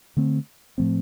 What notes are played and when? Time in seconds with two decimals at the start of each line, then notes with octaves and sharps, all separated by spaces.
0.17 D3 A3 C4
0.78 A2 F3 A3 C4